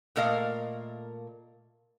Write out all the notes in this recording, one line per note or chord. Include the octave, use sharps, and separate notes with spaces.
A#2 A3 A#4 D#5 F5